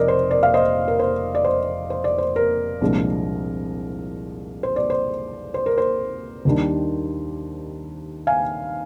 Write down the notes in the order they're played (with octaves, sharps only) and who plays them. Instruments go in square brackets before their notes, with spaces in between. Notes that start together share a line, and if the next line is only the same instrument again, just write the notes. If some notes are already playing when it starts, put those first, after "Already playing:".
Already playing: [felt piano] F1 F2 A#4 D5 D#5
C5
A#4 D5
F5
C5 D#5
A#4
C5
D5
C5
C5
D5
C5
A#4
C2 A#2 F3 G#3 D4
C5
D5
C5
C5
A#4
C5
D#2 D#3 G3 D4
F5 G#5